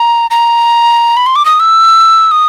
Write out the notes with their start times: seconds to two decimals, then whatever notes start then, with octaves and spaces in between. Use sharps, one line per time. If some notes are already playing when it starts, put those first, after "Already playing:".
Already playing: A#5
0.31 A#5
1.17 B5
1.26 C6
1.36 D6
1.45 D#6
1.60 E6
2.31 D#6